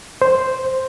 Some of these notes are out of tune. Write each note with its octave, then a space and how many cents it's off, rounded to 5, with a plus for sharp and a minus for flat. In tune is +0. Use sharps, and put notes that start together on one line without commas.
C5 +0